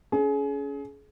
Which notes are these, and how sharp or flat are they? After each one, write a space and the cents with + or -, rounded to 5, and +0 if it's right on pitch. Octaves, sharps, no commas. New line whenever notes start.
C#4 +25 G#4 +30